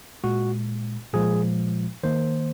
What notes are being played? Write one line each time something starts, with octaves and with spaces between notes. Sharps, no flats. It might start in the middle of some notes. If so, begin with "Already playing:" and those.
A#2 G#3 F#4
A#2 F3 G#3 G#4
D#3 A#3 C5